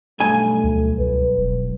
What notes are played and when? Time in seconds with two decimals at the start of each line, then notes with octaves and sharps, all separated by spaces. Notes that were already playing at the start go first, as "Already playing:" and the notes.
0.20 B1 G2 A3 G#5
0.64 D2
0.99 C#2 B4
1.38 E1